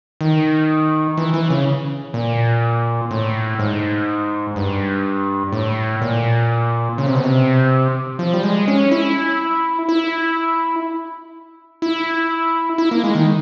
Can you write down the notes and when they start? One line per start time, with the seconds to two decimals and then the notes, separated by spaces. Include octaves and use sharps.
0.21 D#3
1.18 E3
1.34 E3
1.50 C#3
2.14 A#2
3.11 A2
3.59 G#2
4.56 G2
5.52 A2
6.01 A#2
6.98 C#3
7.06 C3
7.15 B2
7.24 C3
8.19 F3
8.34 G3
8.43 G#3
8.68 C#4
8.91 E4
9.89 E4
11.82 E4
12.78 E4
12.91 A#3
13.04 G#3
13.15 D#3